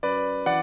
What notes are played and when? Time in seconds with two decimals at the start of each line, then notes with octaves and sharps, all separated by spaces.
0.03 F#2 B4 D5
0.46 E3 D5 F#5